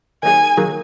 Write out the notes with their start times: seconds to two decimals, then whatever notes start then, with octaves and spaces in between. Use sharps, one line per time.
0.23 D#3 F#3 A#3 D#4 G#4 G#5
0.57 D#3 F#3 A#3 D#4 G#4